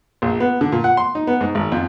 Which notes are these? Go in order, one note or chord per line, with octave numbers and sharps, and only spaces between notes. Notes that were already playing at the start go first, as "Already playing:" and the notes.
A#1
B3
D3
A#2
F#5
C6
D#4
B3
G#2
G#1
F2